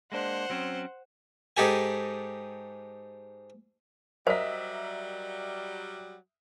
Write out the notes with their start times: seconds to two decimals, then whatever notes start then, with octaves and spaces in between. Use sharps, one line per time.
0.12 G#3 A#3 D4 C5 F#5
0.50 F#3 C4 C#4
1.57 G#2 D#4 G4 A4 G#5
4.27 F#3 G3 A#4 C5 D#5 E5 B6